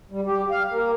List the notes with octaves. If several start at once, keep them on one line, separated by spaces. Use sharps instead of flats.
G3
G4
F5
A#3